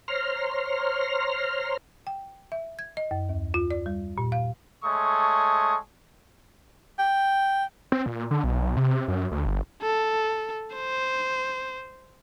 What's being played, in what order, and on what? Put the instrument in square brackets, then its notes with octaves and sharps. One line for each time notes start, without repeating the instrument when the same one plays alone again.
[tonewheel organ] C5 C#5 A#5 C6 F6
[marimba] G5
E5
G#6
D#5
F#2
D#2
F4
D5
G3
A#2
F5
[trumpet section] G#3 A3 A4 C#5 C#6 D#6
[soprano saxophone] G5
[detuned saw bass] C4
A#2
D3
B1
C3
F#2
D2
G1
[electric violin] A4
C5